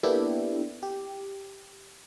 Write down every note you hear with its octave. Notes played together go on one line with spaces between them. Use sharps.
A#3 B3 D4 E4 G4 A4
G4